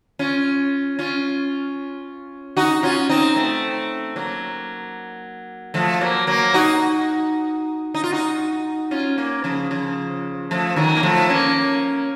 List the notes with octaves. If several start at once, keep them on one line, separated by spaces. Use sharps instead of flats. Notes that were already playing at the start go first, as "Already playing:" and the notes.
C#4 F4
C#4 F4
D#4 F#4
C#4 F4
C4 D#4
A3 C4
F#3 A#3
F3 A3
F#3 A#3
F#3 A#3
D#4 F#4
D#4
F4
D#4 F#4
C#4 F4
A#3 C#4
C#3 F3
C#3 F3
F3 A3
D#3 F#3
A#3
F3 A3
A#3 C#4